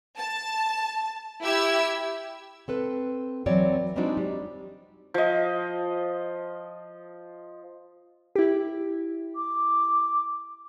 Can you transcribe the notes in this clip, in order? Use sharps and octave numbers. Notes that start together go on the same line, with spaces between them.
A5
E4 G4 E6 G#6
C4 A4 B4
E3 F#3 C4 C#5 D5
G3 G#3 C4 D4 D#4 F#4
G3
F3 D#5
E4 G4
D6